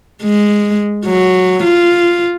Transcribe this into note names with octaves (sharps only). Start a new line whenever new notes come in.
G#3
F#3
F4